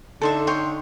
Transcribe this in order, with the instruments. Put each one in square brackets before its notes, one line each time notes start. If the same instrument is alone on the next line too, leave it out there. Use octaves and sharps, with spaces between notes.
[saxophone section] D3 D#4 [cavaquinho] A4 C5 E5
[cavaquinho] C#5 G5 C6